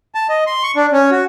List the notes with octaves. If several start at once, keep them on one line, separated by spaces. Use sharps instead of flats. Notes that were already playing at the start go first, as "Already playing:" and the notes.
A5
D#5
C6
C#6
D4
C#4
F#4